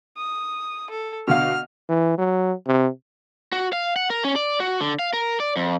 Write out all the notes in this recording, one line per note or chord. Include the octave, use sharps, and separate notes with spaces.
D#6
A4
B2 D3 F5 F6
E3
F#3
C3
F#4
F5
F#5
A#4
C#4
D5
F#4
D3
F5
A#4
D5
F2